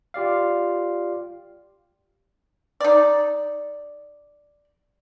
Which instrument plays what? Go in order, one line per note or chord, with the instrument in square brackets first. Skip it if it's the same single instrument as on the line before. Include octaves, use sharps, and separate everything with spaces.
[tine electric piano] F4 G4 D5 F5
[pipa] D#4 D5